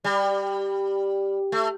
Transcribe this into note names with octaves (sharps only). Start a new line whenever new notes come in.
G3
A3